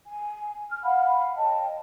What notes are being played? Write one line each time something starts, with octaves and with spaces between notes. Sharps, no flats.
G#5
F6
F5 F#5 B5
C#5 D#5 G5 A5